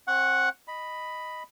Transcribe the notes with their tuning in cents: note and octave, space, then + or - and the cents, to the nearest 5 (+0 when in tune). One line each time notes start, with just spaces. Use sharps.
C4 +35 F#5 +0 C#6 +0
D#5 +0 B5 +0